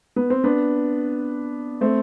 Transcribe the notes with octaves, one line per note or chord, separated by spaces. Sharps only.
B3
C4
B3 D4
A3 C4